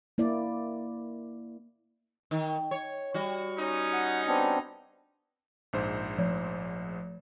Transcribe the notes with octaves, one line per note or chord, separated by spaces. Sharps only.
A#3 E4 D5
D#3
C#5
G3 F#4
C#4 D#4
F#5
B3 C4 D4
A#1 G#2 C5
F3